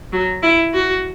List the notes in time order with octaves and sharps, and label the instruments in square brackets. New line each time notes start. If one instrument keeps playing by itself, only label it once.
[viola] F#3
E4
F#4